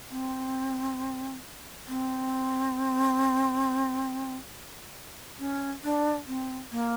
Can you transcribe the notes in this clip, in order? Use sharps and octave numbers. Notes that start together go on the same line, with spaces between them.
C4
C4
C#4
D4
C4
A#3